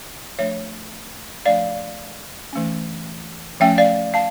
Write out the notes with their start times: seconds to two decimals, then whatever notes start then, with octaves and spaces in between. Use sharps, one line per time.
0.39 F3 A3 D4 C#5 E5
1.46 F3 A3 D4 D5 F5
2.53 E3 A3 C#4
3.60 F3 A3 C#4 E5 G5
3.78 D5 F5
4.14 F5 A5